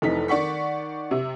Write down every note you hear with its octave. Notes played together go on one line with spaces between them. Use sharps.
F1 E3 D#4 B6
D#3 D5 F#5 C#6 B6
C3